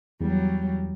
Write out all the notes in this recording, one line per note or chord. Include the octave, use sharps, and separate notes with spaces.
E2 F#3 G3